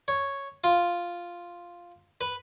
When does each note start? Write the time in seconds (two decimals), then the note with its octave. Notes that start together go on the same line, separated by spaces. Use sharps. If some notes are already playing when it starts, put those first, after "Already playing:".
0.08 C#5
0.64 F4
2.21 B4